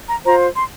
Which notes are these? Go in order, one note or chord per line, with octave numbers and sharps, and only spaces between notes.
A#5
F4 C5 A#5
C6